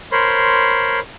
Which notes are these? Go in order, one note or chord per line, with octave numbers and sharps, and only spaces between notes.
A#4 C5 C#5 B5 C6